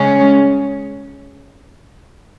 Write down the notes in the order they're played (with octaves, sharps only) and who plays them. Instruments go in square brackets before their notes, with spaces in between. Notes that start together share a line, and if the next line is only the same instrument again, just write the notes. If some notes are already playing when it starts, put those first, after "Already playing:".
Already playing: [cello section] C#3 G#3 C#4